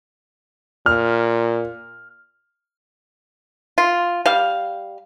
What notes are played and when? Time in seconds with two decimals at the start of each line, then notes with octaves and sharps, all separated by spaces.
0.86 A#2 F6
3.78 F4
4.26 G3 F5